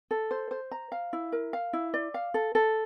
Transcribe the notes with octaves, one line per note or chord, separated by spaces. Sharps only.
A4
C5
C5
A#5
F5
E4
A#4
F5
E4
D5
F5
A4
A4